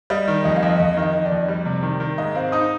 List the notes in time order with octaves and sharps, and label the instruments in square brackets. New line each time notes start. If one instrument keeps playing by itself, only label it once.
[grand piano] G3 [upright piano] D#5
[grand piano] D#3
[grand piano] F2 [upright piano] D#5
[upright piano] F5
[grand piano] F2 [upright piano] D#5
[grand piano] F2 [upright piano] D#5
[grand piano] D#3
[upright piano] D#5
[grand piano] D#3
[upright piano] D5
[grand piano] F2
G3
C3
D#3
D#3
[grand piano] G#2 [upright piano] D#5
[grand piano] C4 [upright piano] F5
[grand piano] D#4 [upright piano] D#6